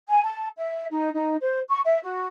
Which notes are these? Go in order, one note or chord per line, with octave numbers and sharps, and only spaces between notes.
G#5
A5
E5
D#4
D#4
C5
C#6
E5
F#4